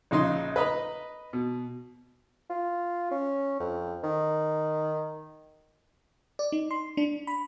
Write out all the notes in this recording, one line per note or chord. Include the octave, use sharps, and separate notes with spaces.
A#1 C#3 D#4 C6
B4 D#5 A#5 B5
B2
F4
C#4
F2
D#3
D5
D#4
C6
D4
B5